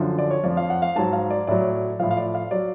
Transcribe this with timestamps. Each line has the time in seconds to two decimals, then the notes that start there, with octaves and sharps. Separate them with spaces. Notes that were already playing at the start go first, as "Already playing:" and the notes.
Already playing: F#2 D3 F3
0.18 D5
0.31 C#5
0.44 F2 F3 D5
0.57 F5
0.70 F#5
0.82 F5
0.96 G#2 F#3 A5
1.13 F5
1.30 D5
1.47 A2 F#3 D5
1.99 A2 F3 F5
2.11 F5
2.17 D5
2.35 F5
2.51 F#3 D5